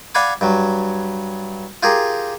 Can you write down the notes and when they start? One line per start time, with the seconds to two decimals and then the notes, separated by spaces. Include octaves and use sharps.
0.15 D5 F5 F#5 G#5 B5 D6
0.41 G2 F#3
1.83 F4 G4 G#4 A#4